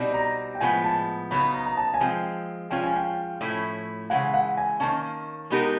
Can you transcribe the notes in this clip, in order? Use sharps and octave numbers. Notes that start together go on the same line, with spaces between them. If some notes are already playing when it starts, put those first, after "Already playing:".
Already playing: B2 G3 C4 D#4
A#5
G5
A2 F3 G#3 B3 G#5
A5
C#3 F#3 B3 D#4 B5
A#5
A#5
A5
G#5
F3 G#3 C4 G5
F3 G#3 C#4 F4 G5
G#5
G5
A2 F3 A3 C#4 E4
C#3 E3 G#3 F#5
F#5
G#5
D#3 F#3 A#3 C#4 A5
G#3 B3 D#4 G4 A#4